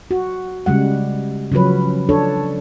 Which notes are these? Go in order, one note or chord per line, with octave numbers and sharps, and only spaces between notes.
F#4
C#3 G3 G#3 F#5
C#3 F3 F#3 C#4 B4
D4 A4 C#5